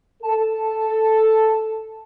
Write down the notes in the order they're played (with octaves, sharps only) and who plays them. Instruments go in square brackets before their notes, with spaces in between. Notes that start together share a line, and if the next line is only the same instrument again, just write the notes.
[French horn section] A4 [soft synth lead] A5